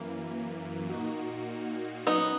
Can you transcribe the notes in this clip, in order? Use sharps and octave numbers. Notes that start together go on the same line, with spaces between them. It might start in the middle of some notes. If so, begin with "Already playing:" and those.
Already playing: F#2 E3 A#3
A#2 A#3 D#4 F#4
F#3 B3 C#4 D#4